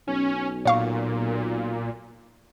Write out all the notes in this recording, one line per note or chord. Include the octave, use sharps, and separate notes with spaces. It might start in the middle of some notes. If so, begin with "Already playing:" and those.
B1 C#4
A#2 C#5 F5 C#6